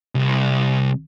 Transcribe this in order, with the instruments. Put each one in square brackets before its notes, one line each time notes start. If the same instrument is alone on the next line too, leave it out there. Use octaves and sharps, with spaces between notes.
[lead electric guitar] C2